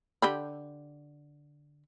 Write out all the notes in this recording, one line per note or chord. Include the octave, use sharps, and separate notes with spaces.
D3 G4 B5